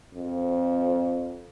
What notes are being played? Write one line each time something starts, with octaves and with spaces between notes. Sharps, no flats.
F2